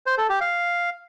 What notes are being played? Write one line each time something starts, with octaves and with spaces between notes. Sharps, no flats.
C5
A4
G4
F5